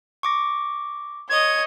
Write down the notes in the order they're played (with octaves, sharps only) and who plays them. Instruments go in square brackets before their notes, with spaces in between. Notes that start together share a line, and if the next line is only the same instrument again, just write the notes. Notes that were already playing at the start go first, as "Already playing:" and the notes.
[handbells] C#6 D6 A#6
[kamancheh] C#5 D#5 [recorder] G#6